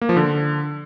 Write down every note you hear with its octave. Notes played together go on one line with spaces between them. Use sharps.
A#3
F3
D3